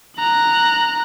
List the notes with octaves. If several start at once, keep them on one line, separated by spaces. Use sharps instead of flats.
A#5 F#6